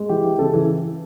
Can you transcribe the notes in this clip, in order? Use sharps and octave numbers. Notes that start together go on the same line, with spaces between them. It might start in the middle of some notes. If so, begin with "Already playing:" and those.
Already playing: G#3
E3 G4
E3
C#3 A4
E3